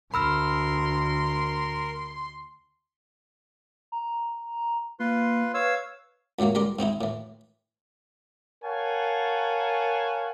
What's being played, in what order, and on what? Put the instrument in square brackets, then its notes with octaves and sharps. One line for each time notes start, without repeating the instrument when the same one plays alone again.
[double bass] D2 [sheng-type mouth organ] A#4 [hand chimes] B5 E6 F6 [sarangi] C6
[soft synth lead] A#5
[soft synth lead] A#3 [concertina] F4 B4 C6
[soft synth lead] B4 [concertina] C#5 F5 E6
[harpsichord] C#2 A2 E3 F#3 A#3
C#2 G3 A#4 C6 D6
G#2 C4 D#4 E4
A2 E3
[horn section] A#4 C#5 F5 F#5 G#5 A5